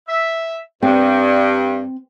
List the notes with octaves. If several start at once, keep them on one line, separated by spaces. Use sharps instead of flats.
E5
G2 C4